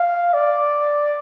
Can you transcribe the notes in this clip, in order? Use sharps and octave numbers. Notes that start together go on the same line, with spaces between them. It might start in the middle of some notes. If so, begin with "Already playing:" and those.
Already playing: F5
D5